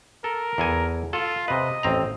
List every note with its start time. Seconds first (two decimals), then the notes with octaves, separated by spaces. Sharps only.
0.24 A4 A#4
0.58 E2 A4 G#5
1.13 F4 A4
1.48 C3 B4 D#5
1.83 A1 C4 A#5